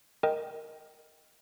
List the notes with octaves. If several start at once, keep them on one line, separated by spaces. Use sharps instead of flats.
A#4 D#5 G5